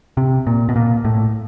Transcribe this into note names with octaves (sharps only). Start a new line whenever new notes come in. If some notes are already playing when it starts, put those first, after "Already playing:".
C3
A#2
B2
A#2
A2